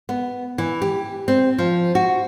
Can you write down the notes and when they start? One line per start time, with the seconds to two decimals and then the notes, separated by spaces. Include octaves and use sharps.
0.09 B3
0.58 E3
0.82 G4
1.28 C4
1.58 F3
1.95 F#4